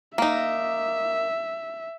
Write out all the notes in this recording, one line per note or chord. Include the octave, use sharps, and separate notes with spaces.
A#3 D#4 E5